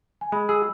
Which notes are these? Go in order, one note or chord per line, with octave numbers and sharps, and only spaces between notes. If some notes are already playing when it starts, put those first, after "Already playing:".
G#5
G#3 B5
G#4 E6